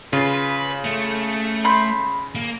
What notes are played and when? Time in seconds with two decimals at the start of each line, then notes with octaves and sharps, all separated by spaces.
0.13 C#3 F4 B4
0.84 A3
1.64 B5 C6 G6
2.35 A#3